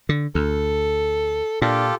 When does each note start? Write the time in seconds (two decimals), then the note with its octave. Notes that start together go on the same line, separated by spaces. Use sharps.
0.09 D3
0.35 D2 A4
1.62 A#2 D4 F4 G4 A4